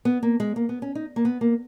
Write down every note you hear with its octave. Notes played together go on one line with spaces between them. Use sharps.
B3
A#3
G#3
A#3
B3
C#4
D#4
A#3
B3
A#3